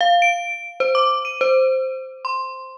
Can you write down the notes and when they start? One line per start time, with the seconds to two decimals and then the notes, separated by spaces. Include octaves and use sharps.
0.01 F5
0.22 D7
0.80 C5
0.95 D6
1.25 D#7
1.41 C5
2.25 C6